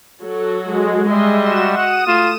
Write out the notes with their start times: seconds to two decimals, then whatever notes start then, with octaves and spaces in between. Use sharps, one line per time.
0.22 F#3 F#4 A4
0.64 G#3
1.09 G3 D#5 E5 C6
1.41 F#4 E7
1.77 F#5 D#6 D#7 E7
2.07 A3 F4